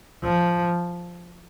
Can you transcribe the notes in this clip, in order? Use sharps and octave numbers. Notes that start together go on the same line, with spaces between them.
F3